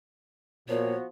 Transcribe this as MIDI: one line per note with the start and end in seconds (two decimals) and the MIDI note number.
0.69 0.94 46
0.69 1.06 53
0.69 1.06 59
0.69 1.06 66
0.69 0.96 73